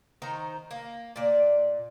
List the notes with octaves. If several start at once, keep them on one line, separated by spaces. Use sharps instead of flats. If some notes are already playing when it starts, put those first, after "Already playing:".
D#3 D#4 C5 A#5
A#3
A#2 D5